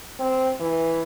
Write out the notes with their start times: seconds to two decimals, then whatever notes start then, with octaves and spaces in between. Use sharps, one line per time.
0.20 C4
0.60 E3